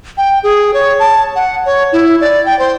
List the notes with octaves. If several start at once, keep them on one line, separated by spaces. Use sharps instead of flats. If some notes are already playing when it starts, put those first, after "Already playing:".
G5
G#4
C#5
A5
F#5
C#5
E4
D5
G5
C5